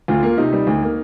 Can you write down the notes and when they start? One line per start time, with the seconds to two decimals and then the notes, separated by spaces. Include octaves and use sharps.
0.08 D2 F4
0.23 A#3
0.38 C3 D#4
0.53 G3
0.67 D2
0.82 A#3